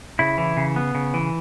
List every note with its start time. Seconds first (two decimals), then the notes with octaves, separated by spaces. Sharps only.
0.19 C#3 E4
0.38 E3
0.57 C#3
0.76 B3
0.95 C#3
1.14 E3